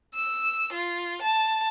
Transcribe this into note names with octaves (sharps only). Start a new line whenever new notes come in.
E6
F4
A5